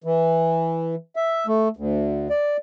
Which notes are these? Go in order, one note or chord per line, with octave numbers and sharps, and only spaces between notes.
E3
E5
A3
D2
D5